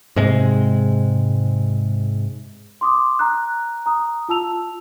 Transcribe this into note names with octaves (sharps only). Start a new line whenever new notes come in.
G#2 C3 G#3
C6 D6 D#6
A#5 F#6
A#5 D#6
F4 A5 E6 F7